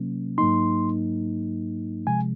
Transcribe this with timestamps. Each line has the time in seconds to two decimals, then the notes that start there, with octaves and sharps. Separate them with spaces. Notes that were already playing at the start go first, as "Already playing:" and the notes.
Already playing: C3 F#3 A#3 C#4
0.38 G#2 F#3 A#3 D#4 C6
2.07 C3 F3 G#3 G#5